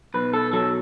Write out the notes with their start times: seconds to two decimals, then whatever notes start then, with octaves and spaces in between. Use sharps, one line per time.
0.14 B1 B4
0.33 A4
0.53 F#3 A4